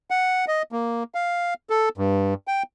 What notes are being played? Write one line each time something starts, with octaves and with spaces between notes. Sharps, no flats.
F#5
D#5
A#3
F5
A4
G2
G5